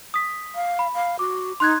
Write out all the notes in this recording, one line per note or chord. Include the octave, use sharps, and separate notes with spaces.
D#6 B6
F5
B5
F5
F#4 D6
D#4 C6 F#6 G#6